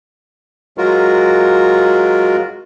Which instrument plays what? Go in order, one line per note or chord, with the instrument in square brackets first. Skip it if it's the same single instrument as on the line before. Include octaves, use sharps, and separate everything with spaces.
[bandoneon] F#3 G#3 F4 F#4 A#4